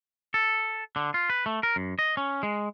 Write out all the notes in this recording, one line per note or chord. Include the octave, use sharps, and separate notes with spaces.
A4
D3
F4
B4
A3
A#4
F#2
D#5
C#4
G#3